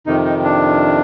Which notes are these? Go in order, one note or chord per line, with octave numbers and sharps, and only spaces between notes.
F2 C3 D#3 D#4
D#4
D4